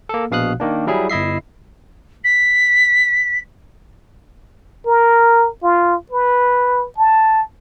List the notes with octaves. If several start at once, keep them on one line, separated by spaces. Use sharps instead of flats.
A#3 A4
A#1 B2 F5 D#6 F#6
D#3 A#3 D4
F#3 G3 E4 G#4
G1 E4 D#5 E5 C7
B6
A#4
F4
B4
A5